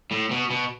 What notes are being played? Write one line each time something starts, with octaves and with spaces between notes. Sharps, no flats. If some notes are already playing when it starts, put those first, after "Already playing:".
A2
B2
B2